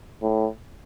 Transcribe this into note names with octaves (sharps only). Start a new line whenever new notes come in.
A2